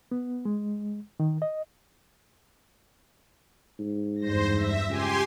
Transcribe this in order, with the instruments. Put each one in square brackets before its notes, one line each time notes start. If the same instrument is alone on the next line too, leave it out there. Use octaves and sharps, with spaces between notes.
[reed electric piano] B3
G#3
D#3
D#5
[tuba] G#2
[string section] E2 G2 A#6 [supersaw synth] C5
[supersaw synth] E5
[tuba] C#2 [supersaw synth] G4 G#5 C6